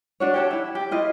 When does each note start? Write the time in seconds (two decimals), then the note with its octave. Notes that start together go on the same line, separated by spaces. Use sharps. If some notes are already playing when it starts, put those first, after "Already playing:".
0.20 D4 F#4 C#5
0.34 G4 C#5 A5
0.51 E4 E5
0.75 G4
0.91 E4 F4 D#5